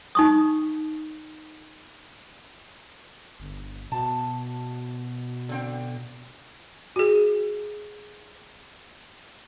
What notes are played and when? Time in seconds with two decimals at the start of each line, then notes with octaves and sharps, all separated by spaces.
0.15 D#4 C#6 D#6
3.40 G1
3.92 B2 A5
5.49 D3 C4 G5
6.96 F#4 G#4